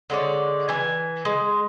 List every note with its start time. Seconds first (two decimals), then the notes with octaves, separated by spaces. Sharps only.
0.10 D3 G#3 C#5 D5
0.69 E3 G#5
1.25 G#3